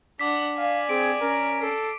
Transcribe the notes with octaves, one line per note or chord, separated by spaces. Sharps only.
D4 F#5 D6 B6
D5 F5 G#5
C4 G#4 D7
C#4 A#4
A4 C7 D7